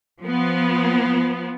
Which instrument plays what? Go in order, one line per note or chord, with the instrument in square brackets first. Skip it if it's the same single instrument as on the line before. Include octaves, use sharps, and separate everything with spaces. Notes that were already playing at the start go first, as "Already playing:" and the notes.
[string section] F3 B3